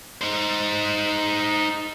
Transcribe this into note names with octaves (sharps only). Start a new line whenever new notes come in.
D#4 C5